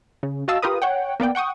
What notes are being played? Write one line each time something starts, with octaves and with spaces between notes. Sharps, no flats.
C#3
F#4 D#5 F5 A5 E6
F4 G4 A#4 B4 D#6
C#5 F#5 G5
A#3 B3 D5 G5
F#5 G5 C#6 D#6